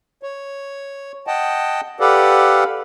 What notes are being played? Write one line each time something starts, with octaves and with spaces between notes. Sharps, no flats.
C#5
D#5 F#5 G5 A5
G4 A4 B4 D5 F5 F#5